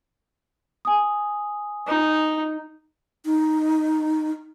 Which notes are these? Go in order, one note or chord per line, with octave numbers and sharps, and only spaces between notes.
G#5 D#6
D#4
D#4